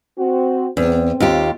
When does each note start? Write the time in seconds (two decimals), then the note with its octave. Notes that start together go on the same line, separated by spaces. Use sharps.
0.18 C4 F#4
0.77 E2 C4
1.20 D#2 F4 G4